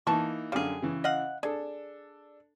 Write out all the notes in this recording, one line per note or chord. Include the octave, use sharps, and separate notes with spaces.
E3 A#3 D#4 A5 C#6
F#2 D3 G3 G#4 F5
C#3 E3
D#5 F5 F#5
D4 G#4 A4